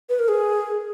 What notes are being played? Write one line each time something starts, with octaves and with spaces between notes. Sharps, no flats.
B4
A#4
G#4